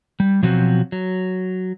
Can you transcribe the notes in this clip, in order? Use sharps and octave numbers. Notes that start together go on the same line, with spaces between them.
G3
B2 F3 F#3 C4 F#4
F#3